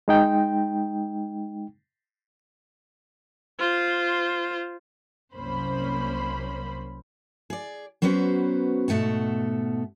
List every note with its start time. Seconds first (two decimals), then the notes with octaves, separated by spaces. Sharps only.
0.08 G#3 D#4 G5
3.59 F4 C5
5.34 C2 F#2 A#3 C#4 C5 B5
7.50 G#4 D5
8.02 F#3 B3 C#4 F#4 B4 C5
8.88 G#2 B2 A3 F#5 A5